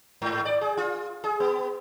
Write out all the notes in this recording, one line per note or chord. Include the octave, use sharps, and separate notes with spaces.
G#2
D5
G#4
F4
G#4
B3